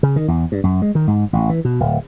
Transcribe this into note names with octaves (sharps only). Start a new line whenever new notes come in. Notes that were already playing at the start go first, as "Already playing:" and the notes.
C#3
D#3
E2
G2
F#2
G#3
D#3
G#2
A1
E3
B2
D1